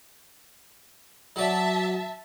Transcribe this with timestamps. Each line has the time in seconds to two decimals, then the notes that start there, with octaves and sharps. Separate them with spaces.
1.36 F#3 D5 E5 A5